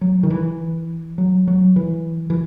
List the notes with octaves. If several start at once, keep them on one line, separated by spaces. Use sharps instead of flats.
F#3
D#3
E3
F#3
F#3
E3
E3